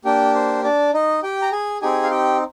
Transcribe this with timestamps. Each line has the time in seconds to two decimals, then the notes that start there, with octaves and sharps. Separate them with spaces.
0.05 A#3 D4 G4 G5
0.35 C5
0.64 D4 D5
0.93 D#4 D#5
1.23 G4 G5
1.42 A#5
1.52 G#4 G#5
1.82 C4 D#4 G4 G#4 G#5
2.03 F5
2.11 G4 G5